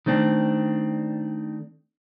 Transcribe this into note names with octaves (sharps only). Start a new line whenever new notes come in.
D#3 A3 C4 D4